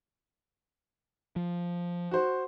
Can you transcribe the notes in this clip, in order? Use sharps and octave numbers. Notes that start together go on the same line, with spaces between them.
F3
F#4 C5